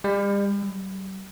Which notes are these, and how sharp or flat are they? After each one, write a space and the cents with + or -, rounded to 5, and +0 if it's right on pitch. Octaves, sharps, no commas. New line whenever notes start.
G3 +40
G3 -45